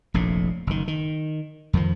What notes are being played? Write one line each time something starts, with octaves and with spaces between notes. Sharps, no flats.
F1 A#1 A2
F#1 D#3
D#3
F2 D#3 F3